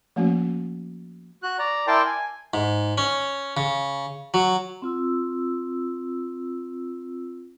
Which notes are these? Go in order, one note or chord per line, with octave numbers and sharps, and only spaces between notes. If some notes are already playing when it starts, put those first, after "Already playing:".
F3 A3 A#3 C#4 F#4
F#4 F#6
D5 A#5
E4 A#4 D5 G5 A5 C6
G#5
G#2
C#4
C#3
F#3
C4 F4 E6